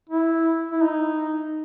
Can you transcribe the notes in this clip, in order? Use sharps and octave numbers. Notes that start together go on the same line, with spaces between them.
E4
E4
D#4